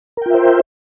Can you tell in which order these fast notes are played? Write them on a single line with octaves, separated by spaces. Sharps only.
A#4 G5 F4 E5 C5